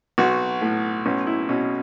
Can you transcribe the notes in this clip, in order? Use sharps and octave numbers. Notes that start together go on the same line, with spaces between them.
B1 F#4
A2
B1 C#4
E4
B2 C#4